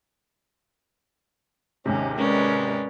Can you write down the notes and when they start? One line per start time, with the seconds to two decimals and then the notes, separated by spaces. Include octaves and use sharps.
1.86 D#2 G#2 C3 D#3 C#4
2.19 G#3 C#4 A#4 B4 D5